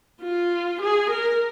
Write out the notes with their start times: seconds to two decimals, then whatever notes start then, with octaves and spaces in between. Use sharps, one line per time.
0.22 F4
0.81 G#4
1.10 A#4